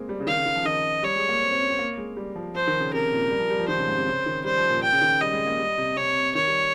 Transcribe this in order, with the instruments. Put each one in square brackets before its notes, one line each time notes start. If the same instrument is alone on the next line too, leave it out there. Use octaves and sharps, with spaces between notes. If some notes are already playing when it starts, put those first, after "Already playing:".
Already playing: [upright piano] G#3 A#3 C4
G3
C#3
[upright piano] D#3 [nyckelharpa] F5
[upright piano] C#3
D#3
F3
[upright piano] D#3 [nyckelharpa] D#5
[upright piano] G3 [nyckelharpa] C#5
[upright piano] G#3
A#3
C4
C4
C#4
C4
A#3
G#3
G3
F3
[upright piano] F3 [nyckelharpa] C5
[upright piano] D#3
C#3
[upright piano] C3 [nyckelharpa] A#4
[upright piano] A#2
G3
F3
G3
F3
[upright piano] D#3 [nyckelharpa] C5
[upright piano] C#3
G#2
C3
C#3
D#3
[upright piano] G3 [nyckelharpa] C5
[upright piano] F3
A#2
[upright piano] A#2 [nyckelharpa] G5
[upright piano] C#3
D#3
[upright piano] G3 [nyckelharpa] D#5
[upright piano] G#3
A#3
G3
C3
[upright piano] C3 [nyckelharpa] C#5
[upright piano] D#3 [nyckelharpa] C#5
[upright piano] G3